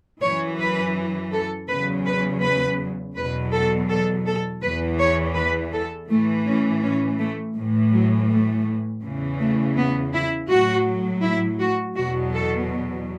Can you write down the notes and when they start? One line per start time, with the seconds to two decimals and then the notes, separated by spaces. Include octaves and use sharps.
0.22 F#2 E3 C#5
0.60 B4
1.33 A4
1.69 E2 C#3 F#3 B4
2.06 B4
2.43 B4
3.16 E2 B2 F#3 B4
3.53 A4
3.89 A4
4.26 A4
4.63 E2 E3 B4
4.99 C#5
5.36 B4
5.73 A4
6.09 A2 E3 A3
6.46 C#4
6.83 C#4
7.20 A3
7.56 A2 E3
7.93 F#3
8.30 A3
9.03 E2 C#3 E3
9.40 A3
9.77 B3
10.13 E4
10.50 A2 F#3 F#4
11.23 E4
11.60 F#4
11.96 E2 B2 F#3 F#4
12.34 A4